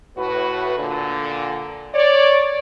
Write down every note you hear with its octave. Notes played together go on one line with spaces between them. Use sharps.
A2 F#4 B4
A#2 D3
C#5 D5